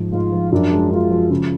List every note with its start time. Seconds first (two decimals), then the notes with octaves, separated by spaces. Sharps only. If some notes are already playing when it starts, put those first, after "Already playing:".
Already playing: G#2 F3
0.12 G#2 F4
0.32 F3
0.52 F#2 D4
0.71 G#3
0.91 G#3 F4
1.10 F3
1.31 C#3